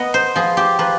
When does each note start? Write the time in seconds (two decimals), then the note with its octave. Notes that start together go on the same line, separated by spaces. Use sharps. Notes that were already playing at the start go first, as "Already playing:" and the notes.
Already playing: B3 D#5
0.14 C5
0.36 F3 G#4
0.57 G4
0.79 F3 B4